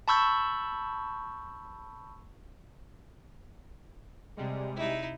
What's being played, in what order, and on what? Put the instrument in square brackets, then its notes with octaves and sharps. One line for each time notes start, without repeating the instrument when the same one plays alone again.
[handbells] A5 B5 C#6 E6 G6
[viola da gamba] C3 [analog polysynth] G3 G#3
[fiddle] D#4 E4